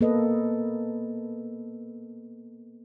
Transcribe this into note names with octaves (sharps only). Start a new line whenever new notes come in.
A#3 B3 A4 B4 D#5